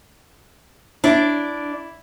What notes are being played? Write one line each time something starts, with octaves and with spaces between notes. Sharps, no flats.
D4 E4 D5